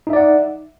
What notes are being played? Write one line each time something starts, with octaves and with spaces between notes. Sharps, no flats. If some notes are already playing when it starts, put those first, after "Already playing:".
D#4 D5 E5 F#5